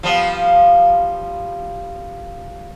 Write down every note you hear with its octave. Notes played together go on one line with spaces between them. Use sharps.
F3 G3 B3